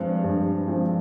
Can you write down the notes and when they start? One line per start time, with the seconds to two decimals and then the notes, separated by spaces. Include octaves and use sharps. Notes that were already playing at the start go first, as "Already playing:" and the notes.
Already playing: G2 F3 G#3 C4
0.24 G2
0.67 F3 G#3 C4